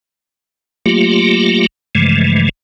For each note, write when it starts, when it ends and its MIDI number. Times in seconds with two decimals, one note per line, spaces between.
0.86 1.66 54
0.86 1.66 57
0.86 1.66 58
0.86 1.66 65
0.86 1.66 67
1.95 2.49 43
1.95 2.49 49
1.95 2.49 52
1.95 2.49 53
1.95 2.49 56
1.95 2.49 57